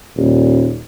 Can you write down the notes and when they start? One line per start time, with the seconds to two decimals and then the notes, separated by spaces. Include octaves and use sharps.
0.16 D#1